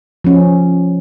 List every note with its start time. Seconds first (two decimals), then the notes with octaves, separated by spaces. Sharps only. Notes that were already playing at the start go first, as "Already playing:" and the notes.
0.24 F3 C#4